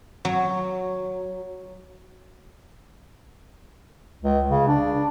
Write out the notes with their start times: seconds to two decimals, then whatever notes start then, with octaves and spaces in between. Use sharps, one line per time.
0.25 F#3
4.22 C#2
4.50 C#3
4.68 D4